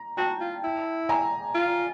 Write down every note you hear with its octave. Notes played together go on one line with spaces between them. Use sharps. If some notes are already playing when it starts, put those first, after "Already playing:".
Already playing: A#5
F#4 G5 A5
F4
E4
G#5 A#5
F4